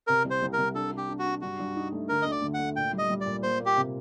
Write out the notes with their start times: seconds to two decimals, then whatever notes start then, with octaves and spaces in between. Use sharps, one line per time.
0.07 C3 A#4
0.24 C2
0.30 C5
0.42 C2
0.53 A#4
0.58 C2
0.74 D4 A4
0.92 D4
0.97 G4
1.09 D4
1.19 F#4
1.25 D4
1.41 G2 F#4
1.59 G2
1.76 D#4
1.92 A3
2.09 D3 A#4
2.22 D2 D#5
2.31 D5
2.42 D2
2.54 F#5
2.59 A3
2.75 A#2 G5
2.93 G3
2.98 D#5
3.10 G3
3.21 D5
3.26 A#2
3.43 A#3 C5
3.60 A#3
3.66 G4
3.76 C3